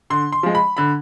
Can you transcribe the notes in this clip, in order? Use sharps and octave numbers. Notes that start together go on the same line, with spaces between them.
D3 C6
C6
F3 G#3
B5
D3 B5